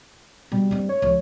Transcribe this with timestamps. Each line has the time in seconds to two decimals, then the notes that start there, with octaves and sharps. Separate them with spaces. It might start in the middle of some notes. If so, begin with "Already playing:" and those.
0.52 B2 G3
0.71 G2 C4
0.89 C#5
1.02 C#2 F3